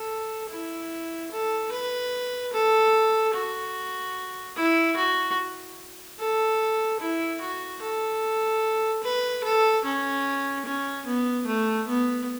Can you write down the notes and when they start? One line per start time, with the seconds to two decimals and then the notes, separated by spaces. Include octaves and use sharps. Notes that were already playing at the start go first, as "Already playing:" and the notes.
Already playing: A4
0.49 E4
1.31 A4
1.72 B4
2.53 A4
3.34 F#4
4.56 E4
4.96 F#4
6.19 A4
7.00 E4
7.40 F#4
7.82 A4
9.03 B4
9.44 A4
9.84 C#4
10.65 C#4
11.06 B3
11.47 A3
11.88 B3